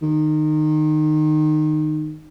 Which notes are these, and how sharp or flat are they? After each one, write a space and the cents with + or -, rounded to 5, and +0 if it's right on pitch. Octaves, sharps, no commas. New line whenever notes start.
D#3 -20